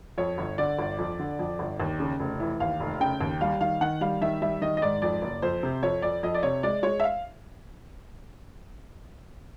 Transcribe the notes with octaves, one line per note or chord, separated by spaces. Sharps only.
F2 C#5
G1
D3 D5
G1
F2
D3
F2
G1
D#2
C#3
F1
E3
D#2 F5
F1
C#3 G5
D#2
G3 F5
D#3 F5
D#3 F#5
G3 F5
D#3 E5
G3 E5
D#3 D#5
D#5
G#2 D5
F2 D5
F#1
F2 C5
C3
F2 C#5
F2 D5
F2 D#5
D5
C3 C#5
G#3 D5
G#3 C#5
E5
F5